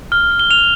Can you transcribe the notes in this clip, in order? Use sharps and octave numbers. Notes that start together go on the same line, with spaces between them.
F6 G7
F6
G7
F6 F7